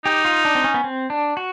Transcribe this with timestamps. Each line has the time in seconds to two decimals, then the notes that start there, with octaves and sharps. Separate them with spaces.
0.05 D#4 G4
0.25 F4
0.45 D4
0.55 C4
0.64 C#4
0.74 B3
0.84 C4
1.10 D4
1.37 F#4